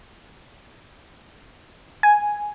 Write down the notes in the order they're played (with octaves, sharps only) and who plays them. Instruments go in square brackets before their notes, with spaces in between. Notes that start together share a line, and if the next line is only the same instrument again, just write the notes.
[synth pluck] G#5